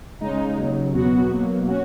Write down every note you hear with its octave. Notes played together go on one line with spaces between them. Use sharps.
C#3 G#3 D#4
D#2 C#3 F#3
E2 B2 F#3 B3 F#4
B2 F#3 A#3
C#4 F#4